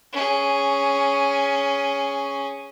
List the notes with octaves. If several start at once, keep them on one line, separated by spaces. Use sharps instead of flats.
C#4 G#4